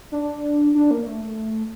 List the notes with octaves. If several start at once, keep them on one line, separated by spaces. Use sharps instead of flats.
D4
D4
A#3
A3